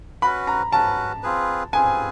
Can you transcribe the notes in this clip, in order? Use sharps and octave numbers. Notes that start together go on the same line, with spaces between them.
C#4 F#4 B4 B5
A#5
C#4 F#4 B4 A5
C4 F4 G#4 B4
C4 F4 G#4 B4 G#5